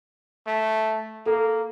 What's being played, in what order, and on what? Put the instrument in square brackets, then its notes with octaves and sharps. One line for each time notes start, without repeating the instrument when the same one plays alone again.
[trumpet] A3
[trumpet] A#3 [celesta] A4